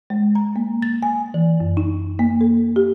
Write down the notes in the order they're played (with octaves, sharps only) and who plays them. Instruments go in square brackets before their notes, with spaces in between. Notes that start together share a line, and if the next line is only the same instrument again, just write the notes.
[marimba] G#3
A#5
A#3
A6
G#5
E3
F#2
D#4
A#3
A4
G4